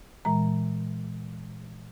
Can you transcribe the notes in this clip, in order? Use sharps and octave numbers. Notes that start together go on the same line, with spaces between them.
A#2 E3 G#3 A#5